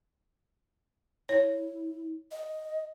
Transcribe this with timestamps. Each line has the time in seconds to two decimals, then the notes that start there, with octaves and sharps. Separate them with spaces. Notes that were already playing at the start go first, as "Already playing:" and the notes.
1.29 E4 C#5
2.31 D#5